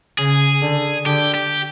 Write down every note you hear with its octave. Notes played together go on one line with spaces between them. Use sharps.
C#3 G#4
D3
D3 G4
G4